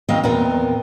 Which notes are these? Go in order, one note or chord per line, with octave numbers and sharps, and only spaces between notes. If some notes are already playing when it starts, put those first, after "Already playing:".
E2 D#3 C4 D#5 F5 G5
E2 A#2 B3 C4 A#4 G5